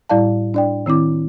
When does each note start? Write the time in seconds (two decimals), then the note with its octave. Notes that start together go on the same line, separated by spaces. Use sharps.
0.09 A2 G3 E4 D5 F5 A5
0.54 D4 D5 G5
0.86 D#3 C4 E4 D6